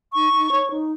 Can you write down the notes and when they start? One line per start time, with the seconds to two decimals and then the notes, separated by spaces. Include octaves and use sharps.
0.15 D#4 C#6
0.33 D#4
0.52 C#5
0.70 D#4